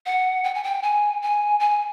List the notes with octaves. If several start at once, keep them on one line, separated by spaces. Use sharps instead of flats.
F#5
G5
G#5
G5
G#5
G#5
G#5